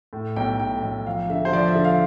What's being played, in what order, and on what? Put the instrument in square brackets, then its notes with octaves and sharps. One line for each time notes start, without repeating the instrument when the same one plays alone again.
[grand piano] A2
B1 G5
A2 G5
B1
F3 F5
D3 E5
C5
F3 D5
E5
D3
F5